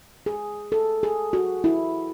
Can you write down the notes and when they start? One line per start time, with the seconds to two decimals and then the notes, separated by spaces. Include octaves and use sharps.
0.26 G#4
0.72 A4
1.03 G#4
1.33 F#4
1.64 E4